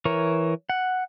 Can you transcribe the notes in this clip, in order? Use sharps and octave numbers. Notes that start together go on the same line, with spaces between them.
E3 A#4 C#5
F#5